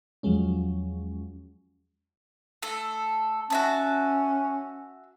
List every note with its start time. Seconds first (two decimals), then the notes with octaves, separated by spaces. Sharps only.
0.23 E2 F3 F#3 G#3 C#4
2.62 A3 A4
3.50 C#4 F#4 E5 A5